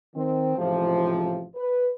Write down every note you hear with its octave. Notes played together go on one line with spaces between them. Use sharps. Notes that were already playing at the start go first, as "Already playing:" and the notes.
D#3 C4
A1 G#2 C3 F3
B4